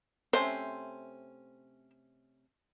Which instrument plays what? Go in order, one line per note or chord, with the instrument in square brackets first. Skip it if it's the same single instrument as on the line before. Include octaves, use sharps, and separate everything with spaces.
[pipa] C3 A3 C#4 [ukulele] C5